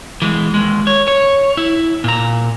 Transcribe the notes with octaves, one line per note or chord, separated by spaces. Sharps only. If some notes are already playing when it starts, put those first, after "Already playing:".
E3 G#3
D#2 G#3
C#5
C#5
E4
A#2 A#5